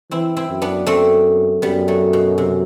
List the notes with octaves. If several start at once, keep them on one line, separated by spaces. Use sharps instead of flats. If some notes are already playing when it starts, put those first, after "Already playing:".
E3 C4 E4
C4 E4
F#2
B3 D4
F#2 A3 C4
F#2 G3 B3
F#3 A3
B2
C3